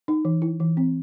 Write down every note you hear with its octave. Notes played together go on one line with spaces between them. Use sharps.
D#4
E3
E4
E3
C4